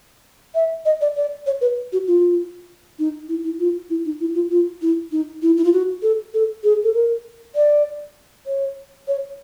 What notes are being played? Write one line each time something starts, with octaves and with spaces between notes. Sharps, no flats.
E5
D#5
D5
D5
C#5
B4
F#4
F4
D#4
E4
E4
F4
E4
D#4
E4
F4
F4
E4
D#4
E4
E4
F4
F#4
A4
A4
G#4
A4
A#4
D5
C#5
C#5